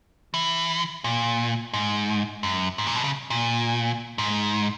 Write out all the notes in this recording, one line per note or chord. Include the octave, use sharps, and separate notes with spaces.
E3
A#2
G#2
F#2
G#2
A#2
B2
C#3
A#2
G#2